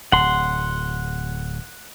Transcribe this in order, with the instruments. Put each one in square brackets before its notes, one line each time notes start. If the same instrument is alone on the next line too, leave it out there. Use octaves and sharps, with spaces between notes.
[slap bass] D1 [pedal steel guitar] F#5 C6